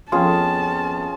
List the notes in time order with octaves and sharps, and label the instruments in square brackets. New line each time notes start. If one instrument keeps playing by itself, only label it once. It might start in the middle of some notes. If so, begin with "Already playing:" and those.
[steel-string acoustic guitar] F2 B3 [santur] C#4 F4 G#4 [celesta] G5 C6 [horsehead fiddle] A5